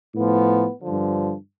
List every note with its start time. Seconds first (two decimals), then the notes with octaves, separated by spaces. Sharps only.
0.14 A2 F3 B3
0.80 G2 D3 F3